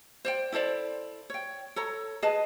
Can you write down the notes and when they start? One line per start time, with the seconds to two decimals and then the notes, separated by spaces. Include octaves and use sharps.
0.25 C5 D5 G5
0.52 E4 A4 C5 D5
1.30 C#5 G5
1.76 A4 C#5 A#5
2.22 G#4 B4 D#5 A5